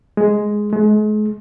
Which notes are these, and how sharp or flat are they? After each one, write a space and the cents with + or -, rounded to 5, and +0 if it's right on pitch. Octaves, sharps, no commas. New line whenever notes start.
G#3 +5
G#3 +40